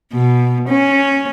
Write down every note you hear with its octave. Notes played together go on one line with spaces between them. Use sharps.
B2
C#4